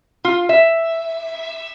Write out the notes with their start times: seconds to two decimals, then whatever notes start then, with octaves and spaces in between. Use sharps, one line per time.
0.25 F4
0.49 E5